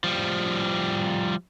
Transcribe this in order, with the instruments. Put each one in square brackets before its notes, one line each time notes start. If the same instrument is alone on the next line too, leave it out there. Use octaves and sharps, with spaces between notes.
[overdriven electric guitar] F3 G3